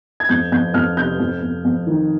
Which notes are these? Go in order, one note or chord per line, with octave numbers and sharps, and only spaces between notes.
G#6
F2 G6
F2 G6
F2 F6
C3 G6
F2
F2
F2
D#3